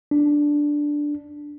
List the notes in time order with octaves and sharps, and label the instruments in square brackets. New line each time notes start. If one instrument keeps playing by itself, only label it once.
[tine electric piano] D4